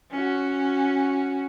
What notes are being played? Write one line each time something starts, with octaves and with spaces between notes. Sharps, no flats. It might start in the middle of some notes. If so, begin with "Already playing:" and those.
C#4 F#4